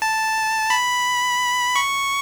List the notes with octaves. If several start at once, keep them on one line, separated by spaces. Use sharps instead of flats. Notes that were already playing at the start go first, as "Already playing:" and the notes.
A5
B5
C#6